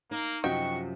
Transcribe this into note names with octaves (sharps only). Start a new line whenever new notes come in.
A#3 D#4
F#2 C3 F3 D#4 F#4 G5 C#6